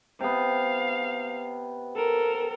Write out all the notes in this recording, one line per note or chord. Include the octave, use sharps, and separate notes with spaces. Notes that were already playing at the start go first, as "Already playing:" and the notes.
C3 B3 F5
A4 A#4